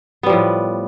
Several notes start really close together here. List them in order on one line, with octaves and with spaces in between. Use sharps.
B3 G3 F3 A2